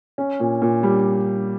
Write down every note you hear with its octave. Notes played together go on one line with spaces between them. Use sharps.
C#4
A#2
A#2
G3